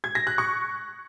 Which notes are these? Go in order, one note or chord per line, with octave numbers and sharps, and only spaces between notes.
G#6
A#6
F#6
C#6